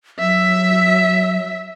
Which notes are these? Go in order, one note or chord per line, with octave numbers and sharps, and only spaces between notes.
F#3 E5